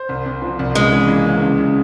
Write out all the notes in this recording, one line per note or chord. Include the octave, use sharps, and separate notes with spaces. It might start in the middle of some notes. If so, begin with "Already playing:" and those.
Already playing: C5
C2
C3
F3
C2
C#3 G#3
E3
A#3
C#3
C#2
C#3